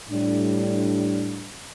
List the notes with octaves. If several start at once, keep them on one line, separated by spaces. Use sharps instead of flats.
A2 G3 D4